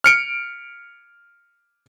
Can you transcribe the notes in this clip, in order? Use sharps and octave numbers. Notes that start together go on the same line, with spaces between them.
F6 C#7 D7